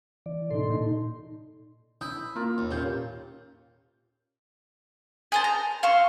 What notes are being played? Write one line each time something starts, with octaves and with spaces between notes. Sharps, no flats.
E3 D5
A2 C3 D#4 A4 C6
A#2 D#4
E4 D#6 G6
A#3 F4 A#4 D5
D#2
A#2 A#3 C#4 G4 G6
G#4 C5 A5
A#5
F5 C6 C#6 E6